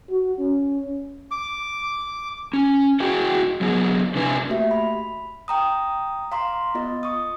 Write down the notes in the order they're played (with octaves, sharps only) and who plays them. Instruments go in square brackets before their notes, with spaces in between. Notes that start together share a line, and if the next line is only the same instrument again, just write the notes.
[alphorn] F#4
C#4
[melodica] D6
[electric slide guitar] C#4
E4 F#4 G#4 D#5 G5
F#3 B3 G#4
C3 C4 D4 E4 B4 G#5
[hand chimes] A3 A#3 F#4 G4 E5
B5
G5 A#5 D#6
F5 A#5 C6 D6
B3 F4 D#5
C#6 D#6